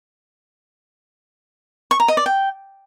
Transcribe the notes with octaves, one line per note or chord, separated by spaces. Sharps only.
C#6
A#5
D#5
D5
G5